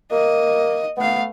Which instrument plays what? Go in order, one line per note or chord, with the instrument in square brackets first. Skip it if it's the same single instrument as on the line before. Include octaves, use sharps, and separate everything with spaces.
[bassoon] A#3 [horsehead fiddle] D#5
[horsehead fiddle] A3 F5 [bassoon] B3